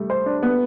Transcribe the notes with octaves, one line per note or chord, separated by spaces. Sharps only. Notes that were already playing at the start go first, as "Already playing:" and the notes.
Already playing: G3 A3
C5
D4
B3